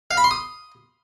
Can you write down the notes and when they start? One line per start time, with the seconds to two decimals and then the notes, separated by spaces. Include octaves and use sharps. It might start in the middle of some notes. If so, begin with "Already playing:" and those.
0.11 F5
0.17 B5
0.24 C6
0.31 D#6